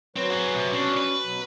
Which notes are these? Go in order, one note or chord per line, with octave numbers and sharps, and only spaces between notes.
F#3 C4 B4 C#5
G#4 F#5
C3
B3 C#4 D4 F#4
B4
B2 F#3